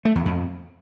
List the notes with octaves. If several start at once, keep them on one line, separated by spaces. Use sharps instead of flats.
A3
E2
F2